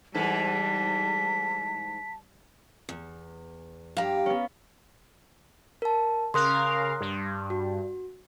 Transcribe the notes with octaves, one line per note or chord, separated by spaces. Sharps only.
G#2 E3 G3 A4 A5 B6
E2
G2 G4 F5 A#5
B3 C#4
A#4 A5
C#3 A#4 F5 C6 D#6 F#6
G2
F#4